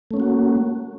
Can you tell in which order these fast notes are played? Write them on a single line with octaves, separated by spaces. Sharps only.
A3 C#4 A#3 F#4